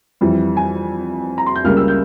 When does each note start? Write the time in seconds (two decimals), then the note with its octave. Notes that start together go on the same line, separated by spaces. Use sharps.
0.21 F2 E3 G3
0.57 G#5
1.38 A#5
1.46 C6
1.56 G6
1.64 C#2 C#3 G3 A#3 F6
1.77 E6
1.88 G6